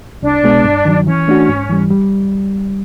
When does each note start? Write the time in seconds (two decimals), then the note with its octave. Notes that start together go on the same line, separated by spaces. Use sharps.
0.23 C2 D4
0.44 B2 G#3 B3
0.64 G2
0.85 D#3 F#3
1.07 E3 C#4
1.28 A3 D4 F#4
1.48 G#2
1.69 E3 G3
1.90 G3